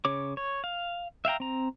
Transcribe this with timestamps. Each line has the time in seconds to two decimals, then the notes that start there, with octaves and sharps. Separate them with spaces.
0.05 C#3 C#5 D6
0.37 C#5
0.64 F5
1.25 E5 F5 G5 A#5
1.40 C4 A#5